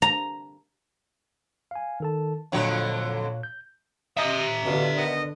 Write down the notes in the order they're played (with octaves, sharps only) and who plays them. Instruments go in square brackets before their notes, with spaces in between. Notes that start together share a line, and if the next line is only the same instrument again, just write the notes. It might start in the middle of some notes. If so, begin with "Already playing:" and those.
[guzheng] A#5
[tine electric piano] F5 G#5
D#3 A4 A5
[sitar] F2 D3 F#3 [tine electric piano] A#2 C#5 F5
[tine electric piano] G6
[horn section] D#5 [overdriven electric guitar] E5 A#5
[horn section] B2 F4 [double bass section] D3
[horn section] D#3 B3 D#5